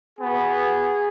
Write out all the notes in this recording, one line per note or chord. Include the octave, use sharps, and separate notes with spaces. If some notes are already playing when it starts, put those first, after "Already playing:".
B3 F#4 G#4